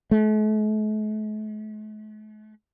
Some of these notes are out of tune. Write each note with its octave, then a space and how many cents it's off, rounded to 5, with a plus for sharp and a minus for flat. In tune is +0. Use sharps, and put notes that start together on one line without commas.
A3 -45